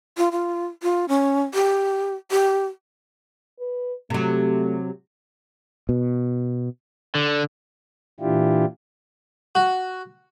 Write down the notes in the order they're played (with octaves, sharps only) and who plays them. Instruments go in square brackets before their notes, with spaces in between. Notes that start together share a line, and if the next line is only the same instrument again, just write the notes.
[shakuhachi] F4
F4
F4
C#4
G4
G4
[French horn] B4
[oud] C3 F#3 [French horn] A3
[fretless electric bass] B2
[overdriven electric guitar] D3
[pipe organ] A#2 E3 D4 E4 F4 G4
[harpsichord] F#4